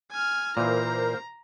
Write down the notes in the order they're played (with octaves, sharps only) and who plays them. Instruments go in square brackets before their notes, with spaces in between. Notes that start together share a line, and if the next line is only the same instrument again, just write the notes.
[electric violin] G#5 F6
[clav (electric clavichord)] A#2 E3 [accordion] A#3 A#4 C5 [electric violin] A#5